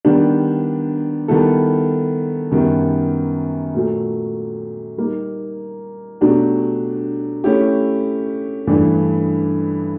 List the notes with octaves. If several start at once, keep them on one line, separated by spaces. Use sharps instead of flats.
D#3 G3 B3 D4 G4
D#3 G3 B3 E4 A4
F#2 D#3 G3 B3
A#2 F#3 A3
G3 A#3 D#4
B2 F#3 A3 D4 G4
A3 C#4 E4 G4
G2 E3 A3 D4